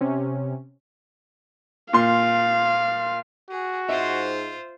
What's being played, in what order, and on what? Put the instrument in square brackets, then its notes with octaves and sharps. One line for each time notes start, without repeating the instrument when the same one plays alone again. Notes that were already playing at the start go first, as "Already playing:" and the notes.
[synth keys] C3 C#4
[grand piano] A#2 C6 [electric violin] F5
[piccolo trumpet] F#4 [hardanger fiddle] G#4
[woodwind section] G#2 [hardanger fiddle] F4 C5 [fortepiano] E5